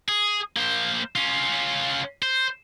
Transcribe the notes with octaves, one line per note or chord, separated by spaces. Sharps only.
G#4
A#3 C5
C#4 F4
C5